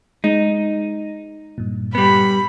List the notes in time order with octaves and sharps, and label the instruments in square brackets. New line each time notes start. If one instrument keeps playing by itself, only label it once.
[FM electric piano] G#3 [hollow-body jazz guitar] D#4
[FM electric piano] G2 A#2
[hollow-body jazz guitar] G3 B3 [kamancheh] B5